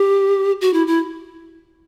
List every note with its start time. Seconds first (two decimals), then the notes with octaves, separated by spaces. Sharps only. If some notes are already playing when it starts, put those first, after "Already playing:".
Already playing: G4
0.61 F#4
0.73 E4
0.87 E4